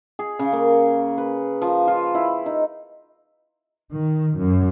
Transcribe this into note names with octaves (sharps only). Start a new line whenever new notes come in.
G#4
C#3
A#3
B4
F3
F4
E4
D#4
D#3
F#2